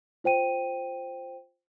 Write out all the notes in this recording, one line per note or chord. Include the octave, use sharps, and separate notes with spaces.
F4 C5 G5 D#7